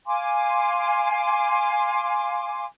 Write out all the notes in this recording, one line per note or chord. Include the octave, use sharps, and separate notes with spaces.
F5 G#5 C6 D6